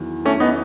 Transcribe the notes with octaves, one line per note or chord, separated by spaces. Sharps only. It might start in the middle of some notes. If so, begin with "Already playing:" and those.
Already playing: E2 D#3 F#3
A3 C#4
B3 D#4